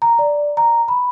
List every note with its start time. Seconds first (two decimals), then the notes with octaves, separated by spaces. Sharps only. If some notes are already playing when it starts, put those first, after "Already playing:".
0.02 A#5
0.19 D5
0.57 A#5
0.88 B5